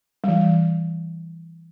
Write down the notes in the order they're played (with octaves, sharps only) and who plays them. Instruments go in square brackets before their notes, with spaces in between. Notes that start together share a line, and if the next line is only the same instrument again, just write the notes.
[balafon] E3 G3